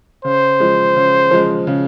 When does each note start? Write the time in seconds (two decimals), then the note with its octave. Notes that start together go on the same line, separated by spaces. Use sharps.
0.25 C#3 C5
0.60 F3 G#3
0.96 C#3
1.31 F3 G#3
1.67 C#3